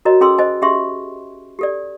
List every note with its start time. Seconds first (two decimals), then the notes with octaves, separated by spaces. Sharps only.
0.05 F#4 A#4 C#5 D#5 A#5
0.21 C#4 G#4 A4 G5 C6 E6
0.38 C5 D#5 G#5
0.62 C#4 G4 G#4 E5 C6 C#6
1.59 G4 A4 D5